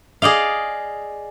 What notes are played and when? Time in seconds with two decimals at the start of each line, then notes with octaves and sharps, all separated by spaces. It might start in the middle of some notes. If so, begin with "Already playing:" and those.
0.22 G#4 D5 D#5 F5